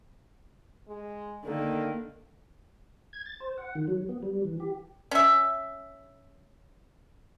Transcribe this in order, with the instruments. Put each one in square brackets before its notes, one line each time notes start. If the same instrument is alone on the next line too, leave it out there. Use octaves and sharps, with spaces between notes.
[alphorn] G#3
[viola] D3 A#3 [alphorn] D#3
[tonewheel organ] G#6
A6
C5
F#5
D#3
F#3
B3
G3
E3
G4
[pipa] C#4 E5